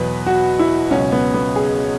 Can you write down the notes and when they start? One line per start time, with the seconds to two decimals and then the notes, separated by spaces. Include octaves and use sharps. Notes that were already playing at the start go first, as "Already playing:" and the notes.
Already playing: E2 B2 F#3 B4
0.26 F#4
0.59 E4
0.91 C#2 B2 F#3 C#4
1.12 B3
1.34 B3
1.56 G#4